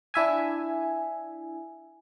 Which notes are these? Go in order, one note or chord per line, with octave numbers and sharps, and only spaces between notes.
D4 E4 E5 G#5